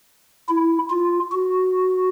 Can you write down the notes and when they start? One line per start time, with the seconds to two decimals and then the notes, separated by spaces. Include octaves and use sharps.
0.49 E4
0.90 F4
1.32 F#4